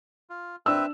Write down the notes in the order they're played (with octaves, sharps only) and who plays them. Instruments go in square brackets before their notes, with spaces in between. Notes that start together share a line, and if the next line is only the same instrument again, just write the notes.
[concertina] F4
[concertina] C4 B4 E5 [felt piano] D4 E6